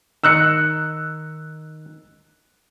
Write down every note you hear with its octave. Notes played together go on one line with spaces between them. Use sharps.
D#3 D#4 E6 F#6 C#7